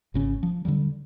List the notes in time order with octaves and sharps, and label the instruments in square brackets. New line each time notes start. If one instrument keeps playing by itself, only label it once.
[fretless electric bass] G#1 C#3 C#4
F3
D3 D#3 F#3 G3